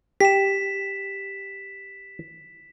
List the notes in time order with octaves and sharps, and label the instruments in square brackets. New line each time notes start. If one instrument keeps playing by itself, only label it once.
[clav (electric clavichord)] G4 [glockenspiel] B6 E7